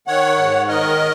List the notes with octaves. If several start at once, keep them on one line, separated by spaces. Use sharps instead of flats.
D#3 C#5 F#5
G#2
D#3 A#4 D#5